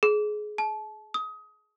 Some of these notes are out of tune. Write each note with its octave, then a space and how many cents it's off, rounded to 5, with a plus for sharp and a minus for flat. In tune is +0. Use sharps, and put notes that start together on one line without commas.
G#4 +20
A5 -30
D#6 +25